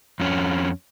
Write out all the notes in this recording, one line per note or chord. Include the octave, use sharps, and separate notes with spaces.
F2 C#4